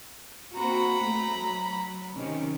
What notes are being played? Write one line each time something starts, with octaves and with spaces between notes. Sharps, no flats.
A#3 C4 F#4 A#5 B5
A3
F#3
C3 D#3 C#4